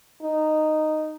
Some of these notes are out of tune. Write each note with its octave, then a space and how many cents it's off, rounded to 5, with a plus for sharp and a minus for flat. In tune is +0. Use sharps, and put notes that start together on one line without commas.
D#4 -10